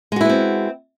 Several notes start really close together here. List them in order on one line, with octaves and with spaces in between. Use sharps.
G#3 F#4 E4 B3 C4